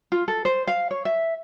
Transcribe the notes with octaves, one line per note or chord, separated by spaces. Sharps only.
F4
A4
C5
F5
C#5
E5